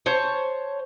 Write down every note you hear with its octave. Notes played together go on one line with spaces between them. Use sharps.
C5 C#5 A5